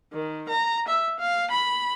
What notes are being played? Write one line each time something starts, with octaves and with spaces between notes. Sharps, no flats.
D#3
A#5
E5
F5
B5